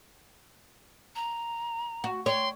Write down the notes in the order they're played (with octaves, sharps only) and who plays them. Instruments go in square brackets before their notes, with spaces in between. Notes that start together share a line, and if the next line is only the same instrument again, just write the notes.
[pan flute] A#5
[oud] F#4
[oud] C#5 [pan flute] G5 [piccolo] C6